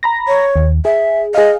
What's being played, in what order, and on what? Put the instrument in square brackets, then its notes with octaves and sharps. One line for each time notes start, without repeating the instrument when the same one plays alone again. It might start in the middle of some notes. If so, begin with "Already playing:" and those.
[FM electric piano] A#5 B5 A#6
[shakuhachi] C#5
[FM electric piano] D#2
[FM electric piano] G#4 [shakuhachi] E5
[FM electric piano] G#4 F5 [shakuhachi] D#5